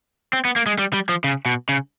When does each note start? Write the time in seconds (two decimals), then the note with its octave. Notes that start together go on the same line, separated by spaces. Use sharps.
0.33 C4
0.45 B3
0.56 A#3
0.66 G#3
0.78 G3
0.93 G3
1.09 F3
1.24 C#3
1.46 B2
1.69 C#3